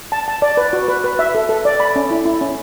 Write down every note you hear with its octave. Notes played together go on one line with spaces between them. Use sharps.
A5
A5
D5
B4
F#4
B4
B4
E5
A4
A4
D5
B5
C#4
E4
E4
C#4